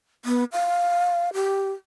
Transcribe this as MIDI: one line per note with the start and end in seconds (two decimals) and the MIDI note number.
0.25 0.44 59
0.53 1.29 77
1.34 1.72 67